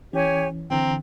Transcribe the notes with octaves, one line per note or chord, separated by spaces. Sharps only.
E3 C#4 G4 C#5 G#5
D3 E3 C4 A#5